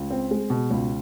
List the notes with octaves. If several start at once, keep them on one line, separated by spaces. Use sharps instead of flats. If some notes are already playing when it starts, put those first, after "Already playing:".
Already playing: C#2
C4
G#3
B2
C#2